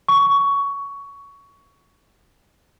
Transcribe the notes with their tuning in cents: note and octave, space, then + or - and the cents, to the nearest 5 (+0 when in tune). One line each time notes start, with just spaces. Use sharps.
C#6 +15